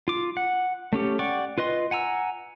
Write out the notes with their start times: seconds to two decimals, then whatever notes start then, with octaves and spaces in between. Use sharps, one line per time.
0.08 F4 D6
0.37 F#5
0.93 A3 C#4 G4
1.19 D5 F#5 G5 C#6 D6
1.58 F4 B4 D#5 C6
1.91 F#5 G#5 A#5 E6